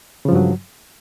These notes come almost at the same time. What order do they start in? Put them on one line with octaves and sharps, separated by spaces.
C#3 F3 G2 F#3